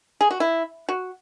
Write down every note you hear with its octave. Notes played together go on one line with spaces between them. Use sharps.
G#4
F#4
E4
F#4